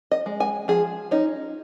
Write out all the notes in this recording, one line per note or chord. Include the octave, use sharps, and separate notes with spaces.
D#5
G#3
G#5
F3 G#4
C#4 D#4